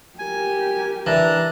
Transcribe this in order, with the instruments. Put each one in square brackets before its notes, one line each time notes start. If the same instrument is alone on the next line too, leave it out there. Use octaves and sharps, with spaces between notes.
[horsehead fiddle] G4 A#4 [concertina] G#5
[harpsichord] E3 [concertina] D4 A5 A#5